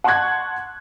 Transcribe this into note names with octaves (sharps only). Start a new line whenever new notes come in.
F#5 A5 C6 C#6 F#6 G#6